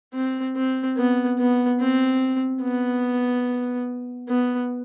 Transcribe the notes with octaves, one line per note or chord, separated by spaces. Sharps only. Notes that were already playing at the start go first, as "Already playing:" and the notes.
C4
C4
B3
B3
C4
B3
B3